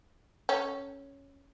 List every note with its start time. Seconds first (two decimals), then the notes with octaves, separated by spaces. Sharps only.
0.49 C#4 A4